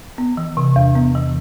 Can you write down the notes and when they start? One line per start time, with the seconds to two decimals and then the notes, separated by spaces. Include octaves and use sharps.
0.18 B3
0.37 E3
0.57 C3
0.76 E2
0.95 B3
1.15 E3